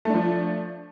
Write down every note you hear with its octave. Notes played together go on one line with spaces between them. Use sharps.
F3 A3 D4